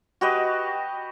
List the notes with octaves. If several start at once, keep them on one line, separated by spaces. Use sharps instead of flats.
F#4 G4 B4 D#5